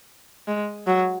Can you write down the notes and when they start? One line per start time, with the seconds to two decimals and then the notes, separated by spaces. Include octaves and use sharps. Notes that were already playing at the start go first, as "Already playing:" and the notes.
0.48 G#3
0.87 F#3